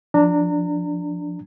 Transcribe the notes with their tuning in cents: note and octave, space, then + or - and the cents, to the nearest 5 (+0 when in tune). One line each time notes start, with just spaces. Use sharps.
F3 +0 D4 +0 A#5 -30